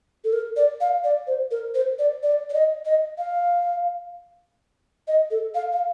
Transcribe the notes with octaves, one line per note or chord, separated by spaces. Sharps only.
A4
A#4
D5
F5
D5
C5
A#4
C5
D5
D5
D5
D#5
D#5
F5
D#5
A4
F5
F5